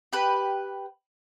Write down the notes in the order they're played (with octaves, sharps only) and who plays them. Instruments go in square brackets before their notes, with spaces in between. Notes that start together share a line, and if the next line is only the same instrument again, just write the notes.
[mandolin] G4 B4